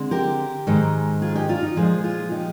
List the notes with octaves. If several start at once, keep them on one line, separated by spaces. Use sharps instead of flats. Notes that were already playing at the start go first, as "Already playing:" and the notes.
Already playing: D3 G#3 C4
G4 A#4
G#2 D#3 G#3
F4 G#4
D#4 G4
D4 F4
D#4
A#2 F3 G#3 G#4 C5
F4 G#4
D#4 G4